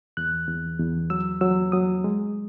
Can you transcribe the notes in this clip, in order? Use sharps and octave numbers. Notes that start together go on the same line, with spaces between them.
E2 F#6
E2
E2
F#3 E6
F#3 E6
F#3 D#6
G#3